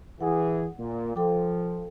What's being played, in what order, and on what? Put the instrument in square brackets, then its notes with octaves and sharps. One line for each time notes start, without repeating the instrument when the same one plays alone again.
[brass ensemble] E3 G#4 [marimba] F#5
[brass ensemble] A#2
[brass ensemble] F3 [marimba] A4 G5 D6